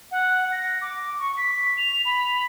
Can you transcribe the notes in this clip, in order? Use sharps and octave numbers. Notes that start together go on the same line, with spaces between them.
F#5
A#6
D6
C#6
B6
F7
B5